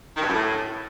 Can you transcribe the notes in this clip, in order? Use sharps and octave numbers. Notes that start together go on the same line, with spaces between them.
D#3
G2
F#2
A2